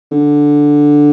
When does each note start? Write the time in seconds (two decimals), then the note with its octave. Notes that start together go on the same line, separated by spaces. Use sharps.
0.12 D3